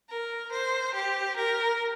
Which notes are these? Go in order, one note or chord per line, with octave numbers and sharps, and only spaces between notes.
A#4
C5
G4
A#4